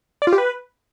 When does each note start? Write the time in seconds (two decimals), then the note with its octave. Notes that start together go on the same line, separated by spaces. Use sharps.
0.22 D5
0.27 F4
0.33 G4
0.38 B4